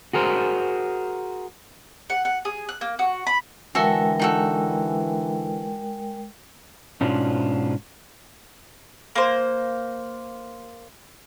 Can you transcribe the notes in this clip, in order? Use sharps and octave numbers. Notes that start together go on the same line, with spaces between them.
F#4 G#4 A#4 C5
F#5
F#5
G#4
F#6
A#3
F#4
B5
D3 E3 G#3 F#4 A4 A#4 E5 G5
D#4 F#4 A4
G#2 B2 C#4 D4 F4
A#3 C5